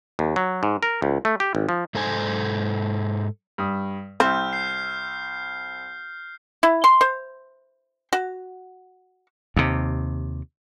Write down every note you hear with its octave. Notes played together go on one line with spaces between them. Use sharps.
D#2
F#3
G#2
A#4
C#2
A3
G4
G#1
F3
G#2 A4 C5 G#5
G2 D#6
C2 C4 E5 F6 G6
G6 C7
E4
C6
C5
F#4
D#2 C3